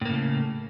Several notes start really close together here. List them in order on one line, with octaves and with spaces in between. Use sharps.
A2 A#3 C#3 A3